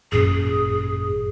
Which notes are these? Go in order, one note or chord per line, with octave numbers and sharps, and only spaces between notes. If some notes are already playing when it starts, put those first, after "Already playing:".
G#1 F#2 A#2 G#4